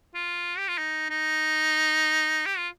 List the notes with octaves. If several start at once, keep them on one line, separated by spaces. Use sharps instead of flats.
F4
G4
F4
D#4
D#4
G4
F4